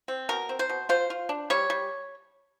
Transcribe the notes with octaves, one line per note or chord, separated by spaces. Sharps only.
C4
B2 A#4
C4
C5
B2
F4 C5
F4
D4
G3 C#5
G3